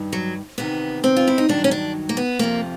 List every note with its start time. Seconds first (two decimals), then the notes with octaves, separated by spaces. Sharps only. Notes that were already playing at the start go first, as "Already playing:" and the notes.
Already playing: G2 D#3
0.13 F#3
0.58 E2 C3 D#3 B3
1.04 C4
1.17 F4
1.27 E4
1.38 D#4
1.49 G2 D#3 F#3 D4
1.64 C#4
1.71 D4
2.09 A#3
2.17 B3
2.39 F2 C3 F3 A#3